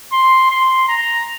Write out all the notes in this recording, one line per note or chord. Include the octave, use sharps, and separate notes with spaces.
C6
C6
A#5